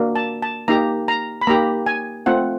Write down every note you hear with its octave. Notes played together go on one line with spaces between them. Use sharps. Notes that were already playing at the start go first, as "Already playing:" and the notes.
Already playing: A#3 D4 F#4
A5
A5
A#3 D#4 G4 A#5
A#5
B5
A#3 D#4 G4 A#5
G#5
A3 C4 F4 F#5